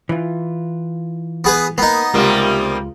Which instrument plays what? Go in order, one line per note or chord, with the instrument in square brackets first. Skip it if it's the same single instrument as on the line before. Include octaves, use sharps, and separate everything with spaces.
[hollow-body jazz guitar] E3 F4
[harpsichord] B3 G#4 B4
[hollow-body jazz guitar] A#3 [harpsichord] B3 D#4
[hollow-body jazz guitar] C#2 G#3 F4 [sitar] C3 G3 A#3